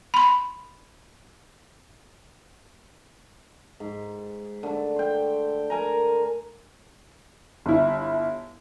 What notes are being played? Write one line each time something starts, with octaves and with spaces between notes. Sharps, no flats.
B5 C6
G#2
D3 A3
C5 G5
A#4 G#5 A#5
G1 E4